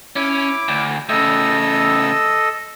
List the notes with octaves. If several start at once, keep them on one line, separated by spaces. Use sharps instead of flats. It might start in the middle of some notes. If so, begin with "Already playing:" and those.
C#4 E4 D6
D2
A2 C#3 A4 D#5 E6